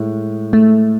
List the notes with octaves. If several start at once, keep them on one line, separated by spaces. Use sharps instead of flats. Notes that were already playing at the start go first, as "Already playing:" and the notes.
Already playing: A2 G#3
A3